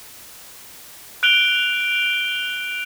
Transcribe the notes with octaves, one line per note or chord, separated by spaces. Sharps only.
F#6 D7 F7 G7